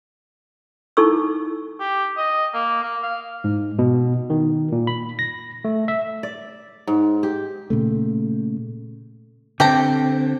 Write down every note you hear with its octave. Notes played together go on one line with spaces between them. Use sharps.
D#4 E4 A4 C#6 E6
G4
D#5
A#3
A#3
F5
G#2
B2
D#3
A#2
B5
A#6
A3
E5
D5
G#2
G4
A#2 C#3 A3
D3 C4 G4 A4 A#5